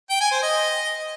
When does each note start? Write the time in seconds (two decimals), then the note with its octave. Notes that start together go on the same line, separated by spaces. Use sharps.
0.10 G5
0.21 G#5
0.32 C5
0.42 D#5